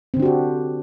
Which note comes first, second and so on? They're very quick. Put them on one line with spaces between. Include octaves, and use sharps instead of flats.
C4 D3 D4 F#4 G4